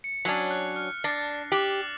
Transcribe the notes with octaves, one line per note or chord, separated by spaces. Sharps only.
C#7
F#3 C#4 D4
F#6
F6
D4 A6 A#6 C7
G4 D6 F#6 F#7